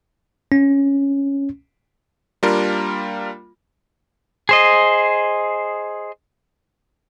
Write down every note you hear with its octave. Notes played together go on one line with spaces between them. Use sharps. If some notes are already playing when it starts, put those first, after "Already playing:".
C#4
G3 A#3 D4 F4 A#4
G#4 C5 D#5